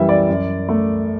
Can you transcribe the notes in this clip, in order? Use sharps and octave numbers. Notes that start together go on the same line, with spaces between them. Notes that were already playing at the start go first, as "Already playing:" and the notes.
Already playing: F#2 E3 G3 E5
D5
F#2
A3